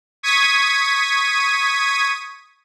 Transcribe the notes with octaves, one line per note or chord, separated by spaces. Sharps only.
C#6 D#6 G#6 B6 D#7